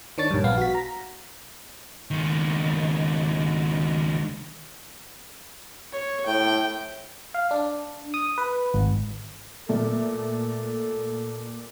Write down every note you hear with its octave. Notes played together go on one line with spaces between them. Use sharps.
D#3 D4 C#5 A6
A#1 G2
A#1 B3 F5
F#4 B6
A#5
C#2 D#3
C#5
A2 G5
F5
D4
D#6
B4
G#1
A#2 A3 A4